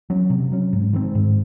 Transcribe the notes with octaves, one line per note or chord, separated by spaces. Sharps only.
F#3 C#4
C3
F#3 C#4
G#2
D#3 G#3 C4
G#2